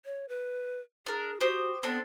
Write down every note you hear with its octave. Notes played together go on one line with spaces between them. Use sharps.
C#5
B4
D4 G#4 A#4
F#4 G4 C5 D#6
B3 C4 D4 A4